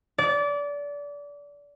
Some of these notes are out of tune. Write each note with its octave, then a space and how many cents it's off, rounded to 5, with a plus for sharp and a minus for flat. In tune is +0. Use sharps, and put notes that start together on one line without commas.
D5 -25